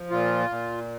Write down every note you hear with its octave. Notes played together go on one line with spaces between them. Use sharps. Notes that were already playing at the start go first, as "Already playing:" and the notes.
Already playing: F3
A#2 F4
A#2